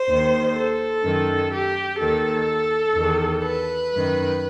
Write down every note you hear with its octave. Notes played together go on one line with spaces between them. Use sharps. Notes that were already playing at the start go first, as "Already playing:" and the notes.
Already playing: C5
D#2 D#3
A4
F#2 D#3
G4
D#2 D#3 A4
E2 D#3
B4
F#2 D#3